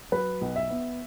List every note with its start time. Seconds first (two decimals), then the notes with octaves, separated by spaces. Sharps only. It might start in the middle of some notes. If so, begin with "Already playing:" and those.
0.12 F#3 B4
0.41 B1
0.56 E5
0.70 B3